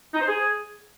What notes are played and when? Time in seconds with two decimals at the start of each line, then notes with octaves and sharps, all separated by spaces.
0.14 D#4
0.21 C5
0.28 G#4